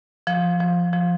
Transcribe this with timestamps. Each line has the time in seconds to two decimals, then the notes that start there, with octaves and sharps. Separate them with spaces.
0.27 F3
0.60 F3
0.93 F3